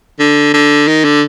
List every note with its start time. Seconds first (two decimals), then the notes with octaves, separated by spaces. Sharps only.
0.20 D3
0.54 D3
0.88 D#3
1.04 D3